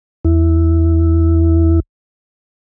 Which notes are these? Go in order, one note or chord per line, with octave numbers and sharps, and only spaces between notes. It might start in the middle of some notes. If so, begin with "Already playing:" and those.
E2 E4